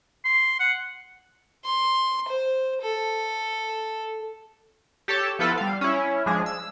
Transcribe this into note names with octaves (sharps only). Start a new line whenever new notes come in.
C6
F#5
C6
C5
A4
G4 A4 C#5 A5
F3 B3 E4 F4 A4 B4
G3 F5
C#4 E4
F3 G#3 D4 G#4
E6